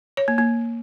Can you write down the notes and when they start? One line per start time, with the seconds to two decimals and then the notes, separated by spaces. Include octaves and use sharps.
0.17 C#5
0.28 A#3
0.38 A#3